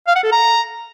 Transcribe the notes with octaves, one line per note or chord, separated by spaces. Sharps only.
F5
F#5
A4
A#5